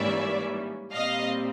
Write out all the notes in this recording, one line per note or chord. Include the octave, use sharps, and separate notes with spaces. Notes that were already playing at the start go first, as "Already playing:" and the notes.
Already playing: G#2 E3 G3 A#3 C#4 D5 E5
A#2 G3 C4 D#5 F5